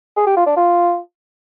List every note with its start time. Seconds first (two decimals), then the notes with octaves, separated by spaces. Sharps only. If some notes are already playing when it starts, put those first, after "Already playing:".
0.17 G#4
0.26 G4
0.36 F4
0.46 D4
0.56 F4